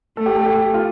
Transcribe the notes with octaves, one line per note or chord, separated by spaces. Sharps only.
A3 A4
G4
A4
G4
F4